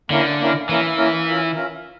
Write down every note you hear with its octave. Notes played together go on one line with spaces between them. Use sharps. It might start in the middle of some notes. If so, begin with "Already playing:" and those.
D3 A#3 C#4 E4 A#4
A#3 C#4 E4 A#4
E3 A#3 C#4 E4 A#4
A#3 C#4 E4 A#4
C#4 F4 A#4 E5
C#4 F4 A#4 E5